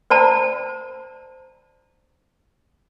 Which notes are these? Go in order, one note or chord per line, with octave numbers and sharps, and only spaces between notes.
C5 D5 A5 A#5